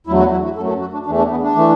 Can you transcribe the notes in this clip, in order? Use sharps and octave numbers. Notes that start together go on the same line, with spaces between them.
E2 D3 F#3 A3 E4
F#4
E4
F#4
F#2 F#3 A3 A4
A4
F#4
D4
E2 E3 A3 D4
D4
B3
D4
E3 A3